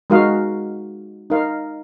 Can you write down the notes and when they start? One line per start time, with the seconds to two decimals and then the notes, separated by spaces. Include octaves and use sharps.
0.10 G#3 D#4 F#4 A#4 F5
1.30 D#4 A#4 F5